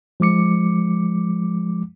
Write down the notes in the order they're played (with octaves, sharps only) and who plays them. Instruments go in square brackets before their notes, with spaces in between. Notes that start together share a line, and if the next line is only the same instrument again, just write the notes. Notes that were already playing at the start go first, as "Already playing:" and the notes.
[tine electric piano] F3 G#3 D6 C#7